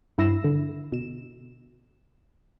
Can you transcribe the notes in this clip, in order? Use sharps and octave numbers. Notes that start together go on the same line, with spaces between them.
G2 E4 E6 A#6 C7 E7
D3
B2 E7